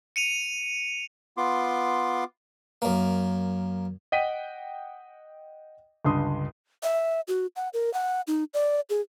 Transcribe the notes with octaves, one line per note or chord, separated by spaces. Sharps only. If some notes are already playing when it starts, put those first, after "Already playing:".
C#7 D#7 F7
B3 F4 C6 D6
F#2 A#3
D#5 F#5 G5 B6 D#7
C#2 G2 D3 C6 D#6
E5
F#4
F#5
A#4
F#5
D#4
D5
G#4